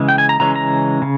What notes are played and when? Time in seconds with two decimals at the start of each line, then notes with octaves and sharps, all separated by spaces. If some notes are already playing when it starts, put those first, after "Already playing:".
Already playing: C#3 E3 G#3
0.09 G5
0.18 G#5
0.29 A#5
0.40 C#3 E3 G#3 C#4 A#5
0.56 A#5
1.02 C#3